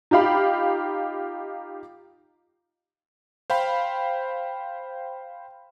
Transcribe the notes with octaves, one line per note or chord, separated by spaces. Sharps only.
D#4 F4 G4 F5 B5
C5 F5 G5 B5